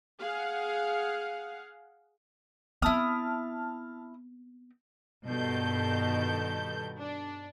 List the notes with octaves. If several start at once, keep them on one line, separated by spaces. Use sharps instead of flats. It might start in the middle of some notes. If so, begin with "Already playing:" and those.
G#4 F5 F#5
B3 C4 E4 A5 D#6 F6
G2 B2 D#3 A4 G6
D4